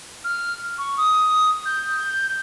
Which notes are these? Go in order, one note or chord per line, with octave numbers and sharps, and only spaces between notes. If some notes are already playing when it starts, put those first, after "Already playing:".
F6
C#6
D#6
G6